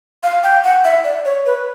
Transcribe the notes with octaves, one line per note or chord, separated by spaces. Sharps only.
F5
G5
F#5
E5
D5
C#5
B4